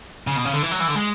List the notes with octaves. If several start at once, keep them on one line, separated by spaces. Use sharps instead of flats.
C#3
B2
C#3
D3
E3
F#3
E3
D3
G#3